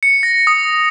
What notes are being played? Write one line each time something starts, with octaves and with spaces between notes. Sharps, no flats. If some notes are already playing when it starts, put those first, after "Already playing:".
C#7
A#6
D#6